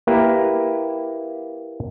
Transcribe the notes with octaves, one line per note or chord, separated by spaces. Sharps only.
A#3 E4 G4 A#4 B4